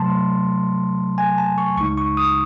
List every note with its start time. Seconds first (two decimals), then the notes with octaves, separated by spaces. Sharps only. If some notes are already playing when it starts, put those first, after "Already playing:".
Already playing: C3 F#3 A3 A5 C6
1.18 G#5
1.38 A5
1.58 C#6
1.77 C#2 C#3 G#3 D#4 C#6
1.98 C#6
2.17 D#6